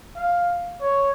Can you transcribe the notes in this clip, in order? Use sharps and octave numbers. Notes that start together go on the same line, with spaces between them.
F5
C#5